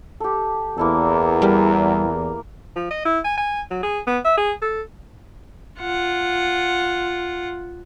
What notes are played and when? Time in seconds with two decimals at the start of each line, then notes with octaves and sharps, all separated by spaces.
0.20 G4 A4
0.78 E2 A#3 E4 A4
1.42 G3 A#4
2.76 F3
2.91 D#5
3.05 E4
3.25 G#5
3.38 G#5
3.71 F#3
3.83 G#4
4.07 B3
4.25 E5
4.38 G#4
4.62 A4
5.80 F4 F#5